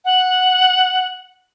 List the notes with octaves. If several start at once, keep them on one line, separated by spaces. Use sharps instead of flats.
F#5